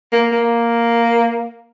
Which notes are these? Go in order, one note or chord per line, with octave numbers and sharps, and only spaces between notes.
A#3
A#3